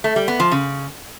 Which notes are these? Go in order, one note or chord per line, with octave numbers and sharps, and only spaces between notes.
A3
G3
B3
F3
C#3